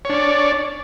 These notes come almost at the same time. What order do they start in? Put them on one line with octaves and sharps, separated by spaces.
C#5 D4 D5